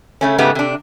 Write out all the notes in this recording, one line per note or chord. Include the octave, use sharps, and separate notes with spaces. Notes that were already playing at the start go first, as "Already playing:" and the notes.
C#3 A3 C#4
G#2 C#3 A3 B3 G4
C3 D4